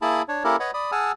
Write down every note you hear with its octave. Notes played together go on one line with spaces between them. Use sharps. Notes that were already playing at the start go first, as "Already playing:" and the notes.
A#3 E4 G#4 A5 B5
D4 C#5
A#3 C#4 E4 G4 A4 A#4
B4 C#5 D#5 F#5 B5
D5 B5 D#6
G#4 F#5 G#5 A5 E6 F6